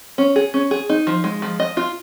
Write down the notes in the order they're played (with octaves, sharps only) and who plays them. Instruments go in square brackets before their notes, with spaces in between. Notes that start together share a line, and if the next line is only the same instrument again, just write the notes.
[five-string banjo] C#4
G#4
C#4
G#4
D#4
F3
G#3
F3
D#5
F4